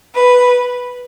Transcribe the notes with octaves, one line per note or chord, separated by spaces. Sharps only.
B4